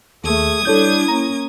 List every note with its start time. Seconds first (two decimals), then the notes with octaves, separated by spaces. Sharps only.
0.24 D#2 A3 G#4 D#6 G#6
0.65 G3 D4 E4 A4 C#5 G6
1.08 A#3 C#4 A#5